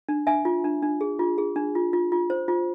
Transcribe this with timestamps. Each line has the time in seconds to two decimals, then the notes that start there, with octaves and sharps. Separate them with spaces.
0.09 D4
0.27 D4 E5 G#5
0.45 F4
0.64 D4
0.82 D4
1.01 G#4
1.19 F4
1.38 G#4
1.56 D4
1.75 F4
1.93 F4
2.12 F4
2.30 C5
2.48 F4